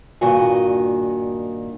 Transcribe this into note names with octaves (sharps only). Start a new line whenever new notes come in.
G2 A#2 D#3 F#4 G#5